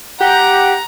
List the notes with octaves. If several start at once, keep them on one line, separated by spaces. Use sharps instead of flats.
G4 F#5 A#5